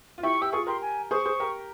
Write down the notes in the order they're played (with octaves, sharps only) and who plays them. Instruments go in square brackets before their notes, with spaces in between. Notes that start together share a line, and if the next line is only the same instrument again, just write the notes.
[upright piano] F4
[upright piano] E4 G4 [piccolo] C#6
[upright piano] G4 [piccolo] E6
[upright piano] F4 G#4 [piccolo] C#6
[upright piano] G4 A#4 [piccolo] C6
[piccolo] G#5
[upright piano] G#4 C5 [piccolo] C#6
[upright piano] G#4 C5
G4 A#4